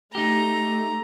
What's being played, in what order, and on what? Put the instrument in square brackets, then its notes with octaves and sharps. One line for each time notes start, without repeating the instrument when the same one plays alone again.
[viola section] A3 [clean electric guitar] D#4 G4 [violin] A#5